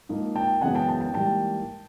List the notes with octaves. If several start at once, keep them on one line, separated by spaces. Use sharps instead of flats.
G#2 F3 A#3 D#4
G5 A5
F#2 C#3 E3 G#3 B3 F#5 G#5
G5 A5
G5 A5
G5 A5
G#2 E3 G3 A#3 G5 A5